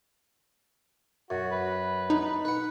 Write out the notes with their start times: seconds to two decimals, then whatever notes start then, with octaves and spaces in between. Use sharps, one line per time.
1.30 F#2 F#4
1.51 B4
2.10 D#4
2.45 B4 F#5